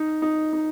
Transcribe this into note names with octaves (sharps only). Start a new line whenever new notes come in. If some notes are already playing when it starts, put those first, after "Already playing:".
Already playing: D#4
D#4
D#4